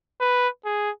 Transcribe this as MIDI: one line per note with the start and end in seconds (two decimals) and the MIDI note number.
0.21 0.48 71
0.65 0.90 68